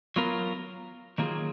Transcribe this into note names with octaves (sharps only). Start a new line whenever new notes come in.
F#3 B3 F4 A#4
D#3 F#3 A#3 F4 G#4